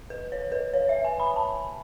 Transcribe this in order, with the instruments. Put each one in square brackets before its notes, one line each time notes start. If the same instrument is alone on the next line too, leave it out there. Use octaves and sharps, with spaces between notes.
[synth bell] B4
C#5
B4
C#5
E5
G#5
B5
A5